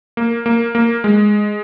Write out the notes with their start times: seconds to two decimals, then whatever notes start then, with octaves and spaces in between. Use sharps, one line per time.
0.17 A#3
0.46 A#3
0.75 A#3
1.04 G#3